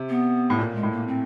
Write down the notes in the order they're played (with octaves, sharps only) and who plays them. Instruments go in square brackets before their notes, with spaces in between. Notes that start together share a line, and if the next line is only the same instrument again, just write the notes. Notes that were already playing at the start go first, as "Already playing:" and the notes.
Already playing: [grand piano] C3
[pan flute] B3
[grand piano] A2
[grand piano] A#2 [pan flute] A#3
[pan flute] G#3
[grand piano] A2
[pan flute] A#3
C4